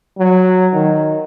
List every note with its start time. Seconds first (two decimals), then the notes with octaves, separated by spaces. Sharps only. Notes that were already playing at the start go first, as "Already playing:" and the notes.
0.18 F#3
0.73 D#3